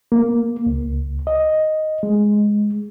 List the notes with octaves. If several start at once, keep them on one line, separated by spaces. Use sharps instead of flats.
A#3
C#2
D#5
G#3